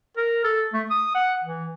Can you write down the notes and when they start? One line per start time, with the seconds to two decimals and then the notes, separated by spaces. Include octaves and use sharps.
0.17 A#4
0.44 A4
0.73 A3
0.90 D#6
1.15 F#5
1.44 E3